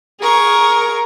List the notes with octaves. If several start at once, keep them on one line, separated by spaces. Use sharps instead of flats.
G#4 A#4 C#6